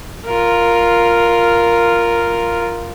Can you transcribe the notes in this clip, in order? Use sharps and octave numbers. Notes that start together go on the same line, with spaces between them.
F4 A#4